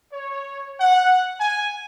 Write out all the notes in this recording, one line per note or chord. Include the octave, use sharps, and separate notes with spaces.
C#5
F#5
G#5